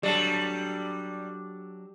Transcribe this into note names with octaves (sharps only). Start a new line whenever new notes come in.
F#3 G3 D4 A4